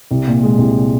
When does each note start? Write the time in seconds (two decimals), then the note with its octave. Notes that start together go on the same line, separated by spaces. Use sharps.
0.11 C2
0.27 A#2
0.43 G#3
0.58 C2